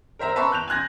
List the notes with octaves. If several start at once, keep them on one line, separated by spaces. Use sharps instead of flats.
A#4 C5 E5 A#5
B4 E5 A5 A#5 C6 C#6
F#6 G6 F7
G#5 C6 F#6 G#6 A#6